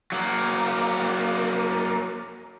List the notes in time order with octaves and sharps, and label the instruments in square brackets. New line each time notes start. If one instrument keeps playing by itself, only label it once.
[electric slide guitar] F#3 A#3